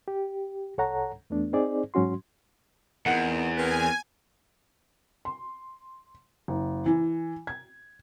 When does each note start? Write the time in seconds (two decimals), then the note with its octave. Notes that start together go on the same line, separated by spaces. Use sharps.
0.08 G4
0.78 C2 A4 C#5 F#5 A#5
1.30 E2 A3 B3 D4
1.53 C4 D#4 G#4 C5 D5
1.94 G#2 F#3 C#4 F#4 C6
3.06 E2 C4 D#4 A#4 F#5
3.58 C4 A#4 B4 G#5
5.25 C6
6.48 F#1
6.86 E3
7.47 G#6